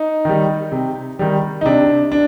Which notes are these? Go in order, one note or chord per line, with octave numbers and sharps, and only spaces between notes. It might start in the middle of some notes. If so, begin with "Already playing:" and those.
Already playing: D#4
D#3 G3
C3
D#3 G3
D#4
C3 D4
D4